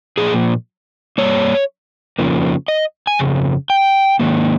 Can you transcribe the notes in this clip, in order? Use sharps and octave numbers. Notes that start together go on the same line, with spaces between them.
A#2 F3 A#3 G#4
G2 G3 A#3 C#5
F2 C#3 F3 A#3
D#5
G#5
F2 C#3
G5
G#2 D#3 A#3